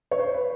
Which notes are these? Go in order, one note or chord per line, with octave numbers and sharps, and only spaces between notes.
C#5
C5
B4